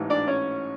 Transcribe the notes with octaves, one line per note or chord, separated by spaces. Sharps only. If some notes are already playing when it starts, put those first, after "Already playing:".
Already playing: A1 G#2 E3
D4 D5
C#4 C#5